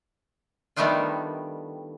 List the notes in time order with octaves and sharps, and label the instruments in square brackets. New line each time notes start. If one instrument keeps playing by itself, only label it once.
[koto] D#3 G3 A3 B3 D4 F4